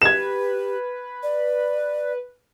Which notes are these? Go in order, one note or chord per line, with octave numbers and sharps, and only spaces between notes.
G4 B4 G#6 E7
D5